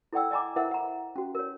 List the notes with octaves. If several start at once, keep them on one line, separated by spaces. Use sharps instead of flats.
E4 A4 D5 F#5 G5 E6
D5 D#5 G#5 A#5 D6
E4 A#4 C5 E5 F#5
F#5 A#5
C#4 F#4
A#4 C#5